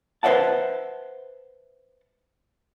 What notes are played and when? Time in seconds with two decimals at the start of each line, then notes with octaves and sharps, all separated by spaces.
0.23 B4 C5 D5 E5 F#5 A5